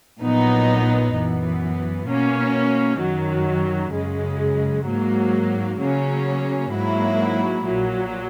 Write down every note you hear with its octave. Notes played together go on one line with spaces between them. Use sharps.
A#1 A#2 F#3 B3 D#4
F#2 E3 B3
B2 A#3 C#4
F#2 D#3 F#3
F#2 C#3 G#3
G#2 F#3 A#3
C#3 F#3 A#3 C#4
G#2 F#3 A#3 E4
A#1 A#2 F#3